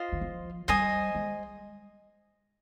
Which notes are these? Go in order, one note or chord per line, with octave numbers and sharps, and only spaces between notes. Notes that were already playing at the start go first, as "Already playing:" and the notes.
Already playing: F4 C5 D#5
D#3
F3
G3 C5 D#5 G#5 D#6
G#3